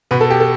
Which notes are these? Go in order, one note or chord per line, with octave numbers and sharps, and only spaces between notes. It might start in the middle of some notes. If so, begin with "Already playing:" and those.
B2 B4
A4
G4
A4